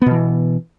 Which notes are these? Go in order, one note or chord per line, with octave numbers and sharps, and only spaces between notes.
B2 E3 B3